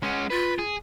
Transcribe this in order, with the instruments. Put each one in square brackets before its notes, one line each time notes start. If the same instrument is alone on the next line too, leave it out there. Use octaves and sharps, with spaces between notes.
[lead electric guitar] G#3 C#4 [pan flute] F#5
[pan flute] F4 [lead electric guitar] B4
[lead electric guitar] G#4